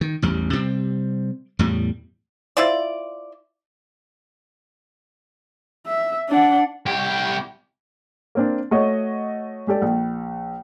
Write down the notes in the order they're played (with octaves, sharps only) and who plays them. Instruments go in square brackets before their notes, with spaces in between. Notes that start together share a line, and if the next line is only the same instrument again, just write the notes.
[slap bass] D#3
A1 E2 G3
C3 G3 C4
E2 A2 G3
[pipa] E4 F4 C5 D5
[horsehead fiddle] E5
D4 F#5
[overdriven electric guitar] C2 G4
[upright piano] A#3 C4 D4
A3 F#4 C#5 D#5
G#3 G4 A4 D5
A#1